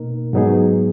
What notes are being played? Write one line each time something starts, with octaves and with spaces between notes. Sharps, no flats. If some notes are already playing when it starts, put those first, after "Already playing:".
Already playing: B2 A#3 D#4 A#4
G#2 F#3 B3 D#4 G#4